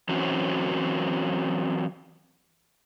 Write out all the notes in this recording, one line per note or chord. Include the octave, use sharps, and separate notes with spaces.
E3 F#3 C4 C#4 F#4